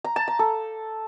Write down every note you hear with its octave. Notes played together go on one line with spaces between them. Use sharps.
A#5
A5
A#5
A4